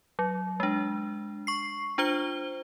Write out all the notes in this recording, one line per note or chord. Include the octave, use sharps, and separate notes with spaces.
F#3
G#3 D4
C#6 C7
D4 F4 C5 G7